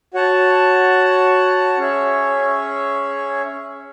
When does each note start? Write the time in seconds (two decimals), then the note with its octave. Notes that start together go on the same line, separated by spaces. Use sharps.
0.14 F#4 C#5 F#5 A5
1.78 C#4 G#4 C#5 E5